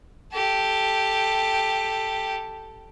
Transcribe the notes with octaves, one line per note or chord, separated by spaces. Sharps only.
G4 A4